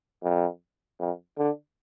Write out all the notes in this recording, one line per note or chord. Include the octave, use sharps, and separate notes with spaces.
F2
F2
D3